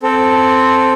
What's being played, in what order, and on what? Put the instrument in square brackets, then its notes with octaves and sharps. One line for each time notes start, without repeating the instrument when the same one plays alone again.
[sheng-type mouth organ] C4 A4